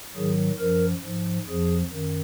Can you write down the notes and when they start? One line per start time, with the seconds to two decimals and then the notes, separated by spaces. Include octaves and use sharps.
0.15 G#2 D#3 F#3 G#4
0.59 F#2 F3 A#4
1.04 G#2 F3
1.48 F2 F3 G#4
1.92 F#2 D#3